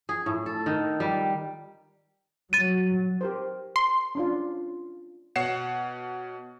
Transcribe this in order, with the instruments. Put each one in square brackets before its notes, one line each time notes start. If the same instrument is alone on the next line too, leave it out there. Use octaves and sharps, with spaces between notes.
[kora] G#4
A2
A4
D#3
G3
[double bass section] F#3 [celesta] A6 D#7
[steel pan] G4 A#4 C5
[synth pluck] C6
[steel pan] C#4 D4 F4
[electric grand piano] B2 C#5 F#5 C7 C#7 E7